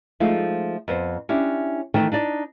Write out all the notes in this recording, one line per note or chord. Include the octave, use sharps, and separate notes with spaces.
F3 G#3 A3 D#4 F4
F2 B3 C5
C#4 D4 E4 G4
D#3 E3 A3 D#4 G5
D4 D#4 D5